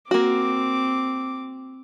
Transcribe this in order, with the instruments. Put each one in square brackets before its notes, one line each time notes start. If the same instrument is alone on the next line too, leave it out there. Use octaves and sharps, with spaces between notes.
[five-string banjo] A#3 F#4 [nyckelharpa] C4 D6